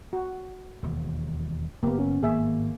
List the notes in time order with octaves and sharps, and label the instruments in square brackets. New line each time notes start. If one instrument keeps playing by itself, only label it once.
[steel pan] F#4
[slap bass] E1 D#2
[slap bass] F#1 [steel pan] A#3 B3 [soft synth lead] G4
[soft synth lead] C#4
[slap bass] G#1 A2 [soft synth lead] A#3 [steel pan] G#4 E5